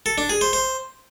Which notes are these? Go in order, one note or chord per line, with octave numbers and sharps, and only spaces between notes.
A4
D4
G#4
C5
C5